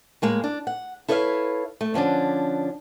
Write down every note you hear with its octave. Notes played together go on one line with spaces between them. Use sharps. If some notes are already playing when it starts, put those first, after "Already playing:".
A2 G#3 A#3
D4
F#5
E4 A4 B4 C#5 D#5 F5
A3
D3 F3 C#4 D4